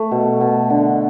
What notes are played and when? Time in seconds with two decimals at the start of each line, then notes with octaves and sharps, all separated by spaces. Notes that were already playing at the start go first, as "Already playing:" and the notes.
Already playing: A3
0.11 B2
0.40 B2
0.70 D3